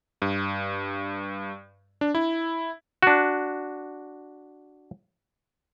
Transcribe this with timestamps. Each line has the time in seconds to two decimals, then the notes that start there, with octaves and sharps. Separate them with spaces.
0.22 G2
2.01 D4
2.15 E4
3.03 D4 F#4